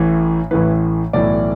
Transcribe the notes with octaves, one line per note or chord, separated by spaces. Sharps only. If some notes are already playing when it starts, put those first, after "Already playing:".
Already playing: A1 A2 E3
A1 A2 E3 B4
B1 A2 E3 D5